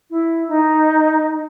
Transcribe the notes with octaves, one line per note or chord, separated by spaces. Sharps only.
E4
D#4